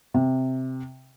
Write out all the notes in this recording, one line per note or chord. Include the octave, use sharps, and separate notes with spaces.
C3